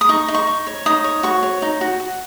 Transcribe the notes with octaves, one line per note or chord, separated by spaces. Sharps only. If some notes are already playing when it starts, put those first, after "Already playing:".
D#6
D#4 C#6
D#4
C#6
D#4
C#5
D#4 D#6
C#5
F#4 C#6
C#5
D#4
F#4
F#4